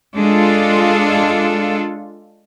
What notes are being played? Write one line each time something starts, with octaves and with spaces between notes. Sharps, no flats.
G#3 D4 F4 A4